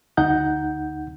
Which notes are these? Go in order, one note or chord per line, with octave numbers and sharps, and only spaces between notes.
D2 D#4 F#5 G6